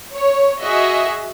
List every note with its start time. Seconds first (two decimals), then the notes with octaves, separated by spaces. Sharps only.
0.14 C#5
0.63 F#4 G#4 D#5 E5